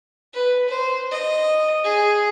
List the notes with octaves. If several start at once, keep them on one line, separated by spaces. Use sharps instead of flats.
B4
C5
D#5
G#4